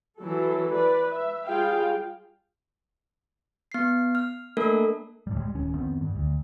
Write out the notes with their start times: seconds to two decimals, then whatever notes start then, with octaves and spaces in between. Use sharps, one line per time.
0.19 E3 F#3 A4
0.73 B4 D5
1.10 E5
1.46 G3 F4 G#4 F5 G5
3.72 B3 C7
4.15 F6
4.57 A3 A#3 D4 A4 A#4
5.27 D2 A2 G3
5.38 G3 G#3
5.54 D1 D#3 C#4
5.75 F2 D#3 B3 C4
6.01 G2
6.15 D2